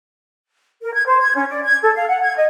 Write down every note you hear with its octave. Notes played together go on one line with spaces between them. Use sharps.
A#4
G#6
C5
G#6
C#4
D5
G#6
A4
F5
F#5
G#6
D#5